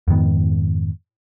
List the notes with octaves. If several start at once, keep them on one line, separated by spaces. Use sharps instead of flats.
F2 G#2 D#3 B3